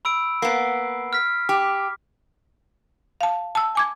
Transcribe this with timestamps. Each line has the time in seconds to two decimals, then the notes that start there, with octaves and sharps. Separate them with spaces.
0.05 B5 E6 D7
0.42 A#3 B3 C7
1.13 F6 B6
1.49 G4 D6
3.21 F5 A5
3.55 A5 E6
3.75 G#5 D6 G#6